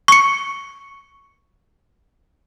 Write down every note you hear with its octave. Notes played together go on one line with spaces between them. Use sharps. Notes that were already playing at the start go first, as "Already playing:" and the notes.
C#6 C#7